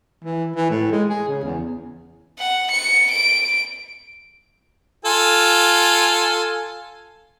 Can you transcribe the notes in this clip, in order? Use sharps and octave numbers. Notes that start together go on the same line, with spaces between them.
E3
E3
A2
G#3
G#4
C#3
E2
F#5
C#7
D7
F4 A4 G#5